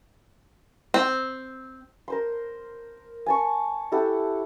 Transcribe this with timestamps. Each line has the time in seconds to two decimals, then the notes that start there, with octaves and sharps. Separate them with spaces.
0.94 C4
2.08 A#4 C5 C6
3.26 G#5 A5 C#6
3.92 E4 G4 A4 F#5